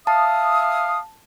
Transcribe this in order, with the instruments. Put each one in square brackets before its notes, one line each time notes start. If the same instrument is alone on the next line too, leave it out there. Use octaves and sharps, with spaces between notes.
[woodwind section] E5 F5 D#6 [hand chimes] A5